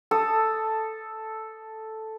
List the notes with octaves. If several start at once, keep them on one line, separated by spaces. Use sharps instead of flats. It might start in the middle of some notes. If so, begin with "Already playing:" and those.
A4 D#6